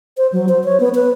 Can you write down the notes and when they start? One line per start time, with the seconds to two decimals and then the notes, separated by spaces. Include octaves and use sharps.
0.17 C5
0.32 F#3
0.49 C5
0.64 C#5
0.80 B3
0.95 B4